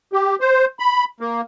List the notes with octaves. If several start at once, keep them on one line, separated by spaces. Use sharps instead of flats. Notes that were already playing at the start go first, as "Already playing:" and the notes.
G4
C5
B5
A#3